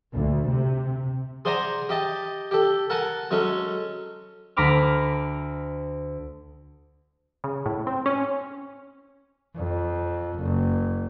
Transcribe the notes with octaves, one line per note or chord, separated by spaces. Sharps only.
D2
C3
G#4 C5 D5 F#5 G#5 A#5
G4 D#5 A5
G4 A4
A4 A#4 F#5 G#5 A5
F#3 G#3 C#4 A4
D2 A#5 B5 D6 F6
C#3
A2
C4
C#4
F2
F#1